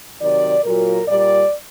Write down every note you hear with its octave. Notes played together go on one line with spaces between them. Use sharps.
C3 D#3 F#3 D5
A#2 F#3 A#4
A#2 G3 D5